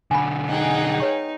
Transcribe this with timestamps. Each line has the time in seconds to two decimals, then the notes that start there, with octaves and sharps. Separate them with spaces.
0.11 B1 D3 G#5 B5
0.50 D#4 G#4 F#5 G5
1.00 B4 C#5 C#6